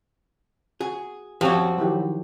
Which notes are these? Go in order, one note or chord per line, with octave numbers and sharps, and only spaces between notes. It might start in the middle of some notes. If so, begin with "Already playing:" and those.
F#4 G#4
F#2 F3 C4 F#4 G4 C#5
D#3 F#3 E4 G4